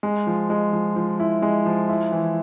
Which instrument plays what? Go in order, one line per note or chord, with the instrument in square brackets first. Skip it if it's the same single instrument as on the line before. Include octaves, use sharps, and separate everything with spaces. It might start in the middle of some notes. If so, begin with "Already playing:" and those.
[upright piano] G#3
F3
G#3
F3
F3
E4
G#3
F3
E4
E3